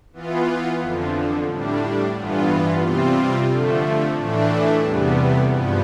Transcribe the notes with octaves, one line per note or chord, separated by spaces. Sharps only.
E3 B3 F4
F2 D3 F3
A2 G3 D4
G2 E3 B3 F4
C3 G3 C4 F4
D3 F3 A3
A2 E3 A3 D4
E2 C3 G3 B3
G2 F3 B3